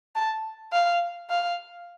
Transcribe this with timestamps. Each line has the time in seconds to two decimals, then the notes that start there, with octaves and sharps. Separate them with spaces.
0.15 A5
0.73 F5
1.30 F5